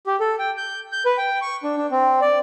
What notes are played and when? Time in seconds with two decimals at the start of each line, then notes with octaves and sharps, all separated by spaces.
0.07 G4
0.20 A4
0.39 G5
0.57 G6
0.92 G6
1.05 B4
1.18 G5
1.42 C#6
1.64 D4
1.77 D4
1.91 C4
2.21 D5